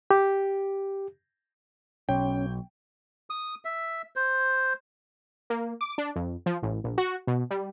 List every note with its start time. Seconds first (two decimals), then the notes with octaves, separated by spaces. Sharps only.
0.10 G4
2.09 B1 C#4 G5
3.30 D#6
3.65 E5
4.16 C5
5.50 A#3
5.81 D6
5.98 D4
6.16 F2
6.46 F3
6.63 A1
6.84 A#1
6.98 F#4
7.27 B2
7.50 G3